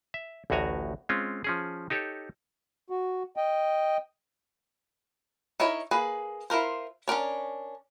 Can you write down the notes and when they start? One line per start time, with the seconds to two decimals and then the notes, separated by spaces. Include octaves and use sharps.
0.14 E5
0.50 A1 D2 A2 F#4 G#5 A#5
1.09 G#3 C4 C#4 F4
1.44 F3 C#4 G#4
1.90 D#4 G4 A4 C#5
2.90 F#4
3.37 D#5 G5
5.60 D#4 E4 A#4 C#5
5.91 A#3 G#4 B4
6.50 E4 F4 A#4 C5
7.08 C#4 D4 A#4 C#5